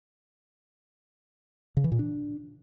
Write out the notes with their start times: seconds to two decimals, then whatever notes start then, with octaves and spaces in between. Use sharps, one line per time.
1.77 C#3
1.84 E3
1.92 A#2
1.99 D4